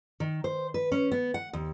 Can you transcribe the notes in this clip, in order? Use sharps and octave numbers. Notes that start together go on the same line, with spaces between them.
D#3
C5
B4
C#4
B3
F#5
D#2